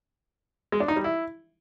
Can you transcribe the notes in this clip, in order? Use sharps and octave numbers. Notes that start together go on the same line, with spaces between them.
G#3
D4
D#4
G3
E4